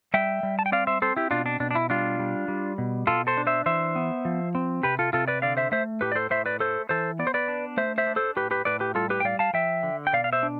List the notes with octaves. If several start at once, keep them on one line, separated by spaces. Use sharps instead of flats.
G3 E5 G5
G3
A5
G5
C4 D5 F5
C5 E5
C4 A4 C5
E4 G4
B2 D4 F4
D4
B2 D4
D4
E4
G3 D4 F4
G3
G3
B2
B2 F4 A4
A4 C5
D4
C5 E5
E3 C5 E5
B3
F3
C4
C3 G4 B4
F4 A4
C3 F4 A4
B4 D5
D3 D5 F5
C5 E5
A3 C5 E5
A2 G4 B4
D5
A4 C5
A2 C5 E5
B4 D5
A3 A4 C5
E3 A4 C5
B3 D5
C5
B4 D5
D4
A3 C5 E5
C5 E5
D4
A4 C5
A2 G4 B4
G4 B4
A2 B4 D5
G4 B4
G3 F4 A4
G4 B4
G5
G3 D5 F5
F5 A5
F3 E5 G5
D3
G5
B2 D5 F5
F5
C5 E5
D4